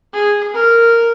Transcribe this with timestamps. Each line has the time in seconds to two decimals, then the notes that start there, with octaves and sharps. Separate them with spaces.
0.13 G#4
0.53 A#4